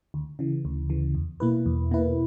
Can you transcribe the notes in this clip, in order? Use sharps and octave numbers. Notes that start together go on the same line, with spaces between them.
D2
C#3 E3
D2
C#3 E3
E2
B2 A#3 E4 B4
E2
B2 A#3 E4 B4